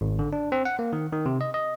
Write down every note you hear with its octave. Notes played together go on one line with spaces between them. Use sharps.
G#1
D3
D4
C4
F#5
A#3
D#3
D#3
C3
D#5
D#5